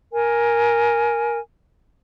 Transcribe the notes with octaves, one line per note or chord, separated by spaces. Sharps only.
A#4 G#5